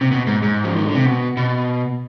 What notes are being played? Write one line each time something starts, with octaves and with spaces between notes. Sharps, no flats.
C3
B2
G#2
G#2
F3
D#3
D3
C3
B2
B2